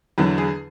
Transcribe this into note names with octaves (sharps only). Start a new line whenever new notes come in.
E2 D3 F#3
G#4